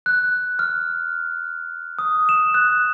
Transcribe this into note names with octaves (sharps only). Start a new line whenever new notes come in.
F#6
F6
D#6
E7
F#6